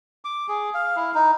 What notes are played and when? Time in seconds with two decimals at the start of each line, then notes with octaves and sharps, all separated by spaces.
0.25 D6
0.48 G#4
0.74 F5
0.97 E4
1.14 D#4